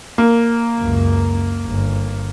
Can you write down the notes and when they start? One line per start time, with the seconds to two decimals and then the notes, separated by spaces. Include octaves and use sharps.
0.18 A#3
0.79 C#2 F#2
1.66 G1